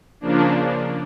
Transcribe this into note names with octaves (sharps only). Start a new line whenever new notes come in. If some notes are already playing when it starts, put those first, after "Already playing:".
C#3 F3 A#3 D4